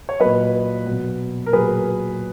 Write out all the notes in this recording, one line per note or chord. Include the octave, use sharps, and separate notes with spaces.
C#5
A#2 F#3 B4 D#5
B2 F#3
A#4
A#2 F#3 G#4 B4